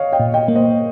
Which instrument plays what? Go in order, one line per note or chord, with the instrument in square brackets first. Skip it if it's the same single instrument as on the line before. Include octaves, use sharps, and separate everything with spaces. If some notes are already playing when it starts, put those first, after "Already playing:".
Already playing: [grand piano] C#5 D#5 F5
D#5 G5
[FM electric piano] A#2
[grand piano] D#5 G5
[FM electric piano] A#3
[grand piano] C5 D#5